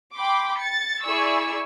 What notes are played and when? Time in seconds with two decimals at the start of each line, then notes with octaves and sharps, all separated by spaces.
0.15 G5 B5 C6 D6
0.59 A6 C#7
1.03 E4 G#4 D5 G#5 C#6 E6